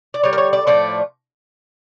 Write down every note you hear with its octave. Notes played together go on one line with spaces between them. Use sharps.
D5
D3 G3 C#5
A#4
C#5
D5
A2 F3 A3 D5